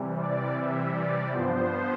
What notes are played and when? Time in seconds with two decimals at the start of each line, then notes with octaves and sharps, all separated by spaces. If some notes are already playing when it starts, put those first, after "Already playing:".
Already playing: C3 E3 G3
0.20 D5
0.57 E5
0.94 D5
1.31 G2 F3 B3 C5